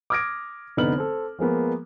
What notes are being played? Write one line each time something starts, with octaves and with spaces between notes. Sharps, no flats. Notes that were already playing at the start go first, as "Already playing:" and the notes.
D6 D#6 F6 G#6 A#6 D7
F1 D3 B3 D#4 F6 F#7
A4 C5
F3 G#3 A#3 B3